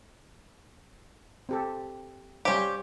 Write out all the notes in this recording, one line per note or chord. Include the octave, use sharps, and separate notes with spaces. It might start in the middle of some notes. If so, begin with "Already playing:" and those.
C4 G4 A4
G3 C#4 G4 C5 F5